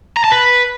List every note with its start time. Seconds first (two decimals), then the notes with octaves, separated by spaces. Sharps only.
0.17 A#5
0.24 A5
0.32 B4